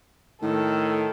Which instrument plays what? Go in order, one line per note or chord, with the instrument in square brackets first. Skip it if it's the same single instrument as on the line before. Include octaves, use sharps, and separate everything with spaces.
[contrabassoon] A2 [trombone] D#3 [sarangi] A4